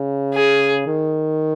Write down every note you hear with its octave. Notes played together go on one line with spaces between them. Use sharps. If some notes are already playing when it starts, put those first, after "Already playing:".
Already playing: C#3
G#4
D#3